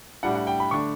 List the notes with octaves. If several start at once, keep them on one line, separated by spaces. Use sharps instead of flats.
A2 G3 D4 F#5
F#5
G5
B5
D3 A3 D4 C#6